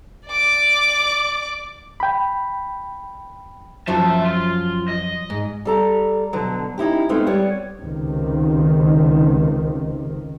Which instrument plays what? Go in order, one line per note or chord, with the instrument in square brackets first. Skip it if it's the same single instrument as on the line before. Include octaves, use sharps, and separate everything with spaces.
[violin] D5 D6
[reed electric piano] G5 B5
[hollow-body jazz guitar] F#2 F3 F#3 [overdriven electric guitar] E5 A5
[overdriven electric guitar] F4
D#5
[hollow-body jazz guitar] G#2
[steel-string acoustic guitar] G3 A4 A#5
B2 D3 F#3
C#4 D#4 E4 G4
G#3 A3 B3 C4 D#4 F4
G3 B3 C#5
[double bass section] C#2 C3 D#3